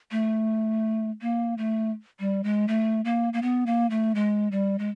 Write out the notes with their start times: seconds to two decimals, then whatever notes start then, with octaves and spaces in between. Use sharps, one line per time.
0.11 A3
1.21 A#3
1.58 A3
2.20 G3
2.44 G#3
2.68 A3
3.05 A#3
3.33 A#3
3.42 B3
3.66 A#3
3.90 A3
4.15 G#3
4.52 G3
4.79 G#3